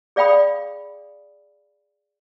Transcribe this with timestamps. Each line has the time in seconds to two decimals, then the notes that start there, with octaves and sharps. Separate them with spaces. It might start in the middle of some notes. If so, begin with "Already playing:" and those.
0.16 G#4 D5 F5 G5 B5 D#6